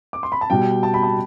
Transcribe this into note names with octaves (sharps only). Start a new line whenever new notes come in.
D6
C6
B5
A5
B2 G3 G5
A5
B5
A5